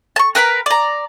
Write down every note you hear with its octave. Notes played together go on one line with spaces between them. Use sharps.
A5 C#6
A#4 B4 G5 B5
D5 A#5